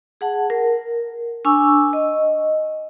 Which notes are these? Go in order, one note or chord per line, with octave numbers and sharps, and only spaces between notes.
G#4 F#5 A5
A#4
D4 G#5 C#6 E6
D#5